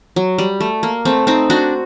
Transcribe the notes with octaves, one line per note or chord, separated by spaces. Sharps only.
F#3
G3
A3
A#3
A3 C4
C4 D#4
D4 F#4